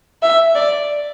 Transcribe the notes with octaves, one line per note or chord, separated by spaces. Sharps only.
E5
D5